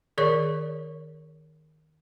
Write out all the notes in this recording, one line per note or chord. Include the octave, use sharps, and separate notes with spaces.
D#3 G#4 A#4 C#5 D5 C#6